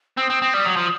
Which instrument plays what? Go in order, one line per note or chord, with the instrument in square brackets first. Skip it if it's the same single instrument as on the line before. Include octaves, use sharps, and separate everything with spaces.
[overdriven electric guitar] C4 [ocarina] E6
[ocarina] D#6
[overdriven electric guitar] C4
C4
G3
F#3
F3